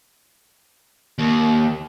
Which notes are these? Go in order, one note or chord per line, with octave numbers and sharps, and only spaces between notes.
D#2